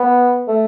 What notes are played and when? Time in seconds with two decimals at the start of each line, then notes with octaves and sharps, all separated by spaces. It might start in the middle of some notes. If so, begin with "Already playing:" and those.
Already playing: B3
0.48 A3